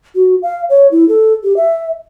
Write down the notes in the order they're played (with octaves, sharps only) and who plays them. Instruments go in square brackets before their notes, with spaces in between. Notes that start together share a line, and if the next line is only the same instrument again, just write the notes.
[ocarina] F#4
F5
C#5
E4
A4
G4
E5